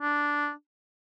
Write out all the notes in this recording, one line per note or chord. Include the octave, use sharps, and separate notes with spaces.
D4